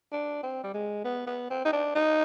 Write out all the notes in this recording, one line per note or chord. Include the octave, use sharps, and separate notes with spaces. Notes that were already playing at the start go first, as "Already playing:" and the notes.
D4
C4
G3
G#3
B3
B3
C4
D#4
D4
D#4